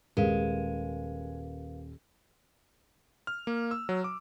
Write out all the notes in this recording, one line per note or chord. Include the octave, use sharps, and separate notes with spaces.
D#1 G#3 A#4 B4 F5
F6
A#3
E6
F#3
D6